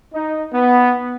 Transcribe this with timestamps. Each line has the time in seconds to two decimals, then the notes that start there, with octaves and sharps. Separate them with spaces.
0.13 D#4
0.53 B3